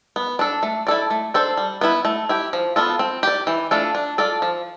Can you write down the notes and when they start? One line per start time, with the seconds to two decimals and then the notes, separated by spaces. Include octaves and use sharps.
0.16 B3
0.39 D4 A4
0.63 A3
0.87 E4 A4 D5
1.10 A3
1.34 D4 A4 C5
1.57 G3
1.81 B3 E4 B4
2.05 A3
2.29 E4 G4
2.53 F3
2.76 B3 F4 A4
2.99 C4
3.23 G4 D5
3.47 E3
3.71 A3 D4 F4 A4
3.95 D4
4.18 F4 A4 D5
4.42 F3